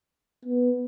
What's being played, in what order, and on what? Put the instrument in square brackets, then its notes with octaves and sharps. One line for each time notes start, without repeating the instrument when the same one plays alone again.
[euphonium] B3